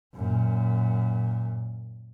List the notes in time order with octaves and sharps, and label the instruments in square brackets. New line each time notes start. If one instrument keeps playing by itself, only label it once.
[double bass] F#2 A#2